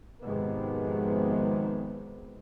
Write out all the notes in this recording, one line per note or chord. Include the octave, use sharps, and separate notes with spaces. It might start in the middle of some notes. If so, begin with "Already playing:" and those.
G#1 F2 C3 D#3 G#3 B3